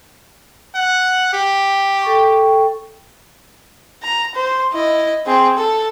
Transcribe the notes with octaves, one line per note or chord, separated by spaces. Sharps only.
F#5
G4
A4 G5 C#6
A#5
C5
E4 D#5
C4 G#4
A4